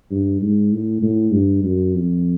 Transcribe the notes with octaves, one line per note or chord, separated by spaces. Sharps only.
G2
G#2
A2
A2
G2
F#2
F2